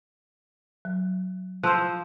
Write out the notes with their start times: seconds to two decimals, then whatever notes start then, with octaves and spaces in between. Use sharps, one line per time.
0.85 F#3
1.64 F3 C5 E6 F#6